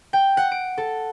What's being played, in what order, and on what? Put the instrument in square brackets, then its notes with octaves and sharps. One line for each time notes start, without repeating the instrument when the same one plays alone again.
[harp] G5
F#5
D7
A4